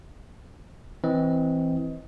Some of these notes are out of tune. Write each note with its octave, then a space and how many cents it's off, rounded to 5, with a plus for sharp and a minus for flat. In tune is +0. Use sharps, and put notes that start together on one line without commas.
E3 -5 C4 +0 D#5 +20